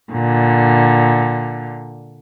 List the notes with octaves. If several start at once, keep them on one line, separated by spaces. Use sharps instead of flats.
A#2 D3